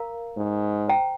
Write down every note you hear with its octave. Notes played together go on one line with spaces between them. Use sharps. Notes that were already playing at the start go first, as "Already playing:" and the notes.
Already playing: A#4 F5 A#5
G#2
C5 G5 A#5